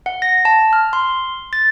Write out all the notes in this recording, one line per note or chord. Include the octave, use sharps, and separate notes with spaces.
F#5
A#6
A5
F6
C6
A6